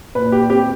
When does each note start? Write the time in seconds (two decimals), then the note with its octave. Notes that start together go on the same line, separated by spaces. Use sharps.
0.15 A#2 B4
0.32 G4
0.50 C4 G4